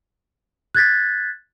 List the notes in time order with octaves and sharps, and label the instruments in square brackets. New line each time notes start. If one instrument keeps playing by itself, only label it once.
[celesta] F#6 G#6 A6 B6